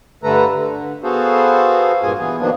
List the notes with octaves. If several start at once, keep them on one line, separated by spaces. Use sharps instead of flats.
G2 D3 A3 A4 B4 A#5
D3
B3 F#4 G#4 A4 C5 F5
G2 A#2 A#3 F4 G#4 G#5
E3 B3 G#4
B2 D#3 F3 A#3 B3 D4